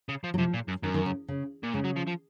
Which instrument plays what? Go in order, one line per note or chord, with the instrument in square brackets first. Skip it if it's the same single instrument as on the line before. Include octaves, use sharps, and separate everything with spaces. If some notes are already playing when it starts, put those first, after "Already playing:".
[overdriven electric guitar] C#3
F3
[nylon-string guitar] F#3
[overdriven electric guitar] C3 [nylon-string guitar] F3
[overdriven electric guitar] A#2
F#2
[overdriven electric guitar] F#2 [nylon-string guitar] D#3
[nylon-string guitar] D#3
C#3
C#3
[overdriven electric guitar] A#2
[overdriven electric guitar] G#2 [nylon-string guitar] C#3
[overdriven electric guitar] F#3
F3
F3